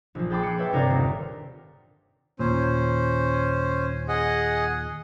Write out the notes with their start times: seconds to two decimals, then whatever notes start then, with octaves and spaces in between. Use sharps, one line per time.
0.15 A#1 F3
0.30 G#4 G5 A5 B5 C6 D6
0.43 D6 F#6 C7 C#7 E7
0.58 B4 C#5 E5 G5 A5
0.73 G1 C3 A#4 C5 D5 F5
0.90 D#1
2.39 D#2 A#2 C#4 C5
4.08 G#4 D#5 F#5